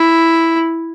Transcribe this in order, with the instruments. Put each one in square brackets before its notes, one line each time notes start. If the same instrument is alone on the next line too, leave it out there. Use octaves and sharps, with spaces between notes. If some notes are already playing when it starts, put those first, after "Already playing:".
Already playing: [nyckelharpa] E4